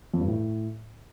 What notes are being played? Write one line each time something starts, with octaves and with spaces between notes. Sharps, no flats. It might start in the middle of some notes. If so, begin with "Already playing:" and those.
F2
G2
A2